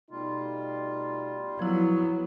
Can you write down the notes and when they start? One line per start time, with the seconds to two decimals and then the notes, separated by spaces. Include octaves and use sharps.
0.11 B2 G3 A3 D#4 F4
1.59 F3 F#3 B3 E4